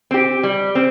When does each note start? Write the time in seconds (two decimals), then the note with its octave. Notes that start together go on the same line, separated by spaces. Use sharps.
0.11 C4 G4
0.43 G3
0.75 C4